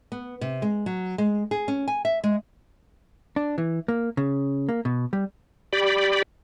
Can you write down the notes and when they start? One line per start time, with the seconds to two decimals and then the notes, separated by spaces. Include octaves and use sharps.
0.12 B3
0.41 C3
0.62 G#3
0.86 F#3
1.18 G#3
1.51 G#4
1.68 C#4
1.88 G#5
2.05 E5
2.24 G#3
3.36 D4
3.58 E3
3.88 A#3
4.17 C#3
4.69 A#3
4.85 B2
5.13 G3
5.73 G4 D5 B5